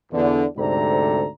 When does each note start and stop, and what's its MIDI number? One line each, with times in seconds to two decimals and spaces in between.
0.12 0.44 40
0.12 0.44 50
0.57 1.26 38
0.57 1.26 44
0.57 1.26 48
0.57 1.26 69
0.57 1.26 74
0.57 1.26 82